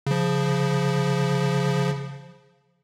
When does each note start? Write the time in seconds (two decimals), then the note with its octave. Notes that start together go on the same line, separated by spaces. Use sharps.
0.07 C#3 F3